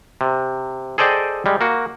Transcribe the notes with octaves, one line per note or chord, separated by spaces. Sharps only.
C3
G#4 A4 C5 D5 D#5 G5
G3 G#3
A#3 F#4